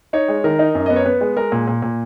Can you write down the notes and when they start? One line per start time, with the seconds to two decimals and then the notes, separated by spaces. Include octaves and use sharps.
0.13 D#4 C#5
0.28 G#3
0.44 D#3 A#4
0.59 D#4
0.75 F#2
0.86 B3 D#5
0.96 C#5
1.05 B3 B4
1.21 G#3
1.37 G#3 A#4
1.52 A#2
1.68 A#2
1.82 A#2